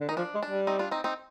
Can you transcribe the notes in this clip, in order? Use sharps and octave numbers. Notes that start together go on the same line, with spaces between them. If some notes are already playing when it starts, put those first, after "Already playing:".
D3
D#3 D#4
F3 D4
G#3
D4
G3
C4 D#4
D4 F4
C4 D#4
C4 D#4